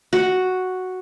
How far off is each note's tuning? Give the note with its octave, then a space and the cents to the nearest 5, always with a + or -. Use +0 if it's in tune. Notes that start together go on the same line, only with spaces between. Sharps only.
F#4 +0